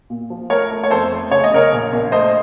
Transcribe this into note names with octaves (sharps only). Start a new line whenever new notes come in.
A#2
F3
A3 A#4 C#5
A3
C#5
F2 A4 C5
A3
C#3 C#5
D#5
C#3 A#4 C#5
A#1
A#1
A3 C5 D#5